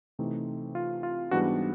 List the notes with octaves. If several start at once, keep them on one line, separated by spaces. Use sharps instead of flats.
C3 E3 A3 C4 D#4
F4
F4
G#2 E3 G3 B3 D4 F#4